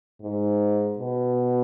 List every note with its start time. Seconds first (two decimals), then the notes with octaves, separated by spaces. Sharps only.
0.21 G#2
0.98 B2